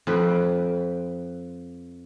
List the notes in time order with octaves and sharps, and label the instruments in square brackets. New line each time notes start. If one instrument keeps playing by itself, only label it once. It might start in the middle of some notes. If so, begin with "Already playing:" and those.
[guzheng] F2 B4 G5